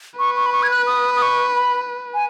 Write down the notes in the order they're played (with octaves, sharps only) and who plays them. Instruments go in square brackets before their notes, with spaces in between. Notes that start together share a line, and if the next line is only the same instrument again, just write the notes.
[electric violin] B4 [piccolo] C#6
[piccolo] C#6
B5
C#6
G#6
F#6
D#6
D#6
C#6
B5
G#5